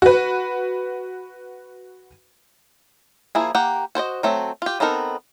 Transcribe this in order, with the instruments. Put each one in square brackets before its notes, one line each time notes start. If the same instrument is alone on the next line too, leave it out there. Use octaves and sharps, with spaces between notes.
[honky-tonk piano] F#4 B4
[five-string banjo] F3 A#3 E4 G#4
A#3 G4 F#5
F#4 C5 C#5 D#5
F#3 A3 C4
F4 G4
B3 C4 D#4 A4 A#4